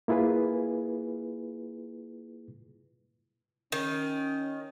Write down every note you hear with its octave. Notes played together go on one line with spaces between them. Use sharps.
A#3 E4 F4 G#4 B4
D#3 C#4